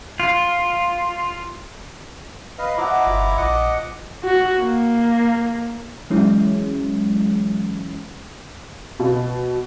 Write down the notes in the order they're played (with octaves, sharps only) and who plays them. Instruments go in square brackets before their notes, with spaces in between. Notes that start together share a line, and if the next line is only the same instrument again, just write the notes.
[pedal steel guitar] F4
[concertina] B4 D#5 F5
[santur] F3 D#5 F#5 [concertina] E4 A#5 D6
[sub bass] G1 [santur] F3
[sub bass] A#1 [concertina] D#5 F#5 D6
[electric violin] F#4
A#3
[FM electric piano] E3 F#3 G#3 C#4 E4
[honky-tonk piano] B2